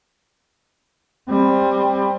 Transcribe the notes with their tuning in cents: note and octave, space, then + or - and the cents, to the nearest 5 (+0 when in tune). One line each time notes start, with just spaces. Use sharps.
G3 +20 C4 +15